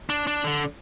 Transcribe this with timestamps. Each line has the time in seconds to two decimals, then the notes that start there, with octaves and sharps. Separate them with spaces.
0.10 D4
0.27 D4
0.44 D3